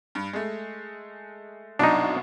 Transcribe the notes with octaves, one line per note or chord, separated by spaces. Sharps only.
G2
G#3 A3
C2 F#2 B2 D4 D#4